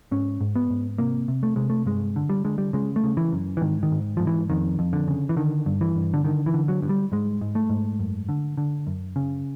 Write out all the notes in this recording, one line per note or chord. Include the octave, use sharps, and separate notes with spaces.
G#2 C#4
G#2
B3
G#2
C3 A#3
C3
A3
C3 G#3
A3
G2 G#3
D3
G3
D3 G#3
G3
C#3 G#3
A3
C#3
E3
F#2
E3
G#2 D#3
D#3
G#2
G#2 F3
E3
F2 D#3
F2
D3
C#3
E3
D3 D#3
G2
E3
G2
D3
D3 D#3
E3
D3
F#3
G2
G3
G#2 G#3
G#2
A3
G#2
F#2
D3
D3
F#2
C#3